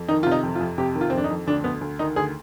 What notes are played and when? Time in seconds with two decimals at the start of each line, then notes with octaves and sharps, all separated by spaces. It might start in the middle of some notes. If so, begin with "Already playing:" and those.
Already playing: F2
0.08 D#3 D#4
0.23 C3 F4
0.32 D#4
0.43 F2
0.55 F4
0.60 F2
0.78 C3 G4
0.95 D#3
1.01 F4
1.10 C4
1.12 F2 D4
1.24 D#4
1.30 F2
1.47 D2 D4
1.64 D2 B3
1.81 D2
1.99 D#3 D#4
2.16 D2 G#4